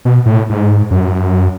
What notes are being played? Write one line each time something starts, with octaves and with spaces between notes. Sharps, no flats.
B2
A2
G#2
F#2